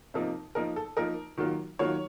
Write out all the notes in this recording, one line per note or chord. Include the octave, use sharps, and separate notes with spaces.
C3 F3 A#3 D#4
F3 A#3 D#4 A#4
A4
F3 A#3 D#4 A#4
D#3 F#3 A#3 F4
D#3 F#3 A#3 F4 C#5